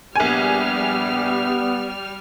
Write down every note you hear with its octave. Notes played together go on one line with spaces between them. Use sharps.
A#1 G3 B3 G#5 F6